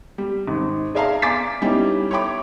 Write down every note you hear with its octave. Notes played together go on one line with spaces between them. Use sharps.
G3
G#1
G#4 D5 E5 F5 A5 A#5
F5 G#5 D6 A6 B6
G3 B3 C#4 D#4 E4 G4
C#5 E5 G5 B5 D6